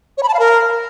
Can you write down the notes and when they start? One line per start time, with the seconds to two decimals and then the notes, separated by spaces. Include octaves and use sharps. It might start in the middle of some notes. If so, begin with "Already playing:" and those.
0.17 C#5
0.23 B5
0.28 A5
0.34 F5
0.39 A#4